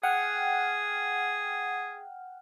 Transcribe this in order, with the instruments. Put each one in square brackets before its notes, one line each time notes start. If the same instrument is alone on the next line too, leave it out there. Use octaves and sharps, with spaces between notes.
[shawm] G#4 [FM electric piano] F#5 G5 F6